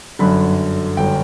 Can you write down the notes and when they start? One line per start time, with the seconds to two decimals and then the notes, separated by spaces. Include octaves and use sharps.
0.19 G1 F#2 D3 B5
0.97 G1 D3 G5